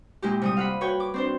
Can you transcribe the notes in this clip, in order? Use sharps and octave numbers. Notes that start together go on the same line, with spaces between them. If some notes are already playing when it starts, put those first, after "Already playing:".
A#2 G#3 E4 G4
C3 G3 D#6
F5 F#5 B5
F#4 B4 C#5 G5
D6
C4 D4 C5